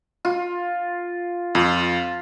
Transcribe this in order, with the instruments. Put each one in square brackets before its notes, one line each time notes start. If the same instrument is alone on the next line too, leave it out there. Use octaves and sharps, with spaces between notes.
[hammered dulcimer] F4
[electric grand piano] F2 [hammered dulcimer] F4